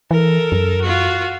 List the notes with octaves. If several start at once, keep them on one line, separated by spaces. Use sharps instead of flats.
E3 A4 A#4
F#2
F4 F#4